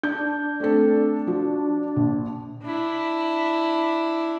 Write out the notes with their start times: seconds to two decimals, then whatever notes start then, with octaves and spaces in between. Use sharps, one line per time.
0.03 D4 G6
0.60 A3 C4 A4
1.27 F3 F#4
1.96 A#1
2.64 D4 E4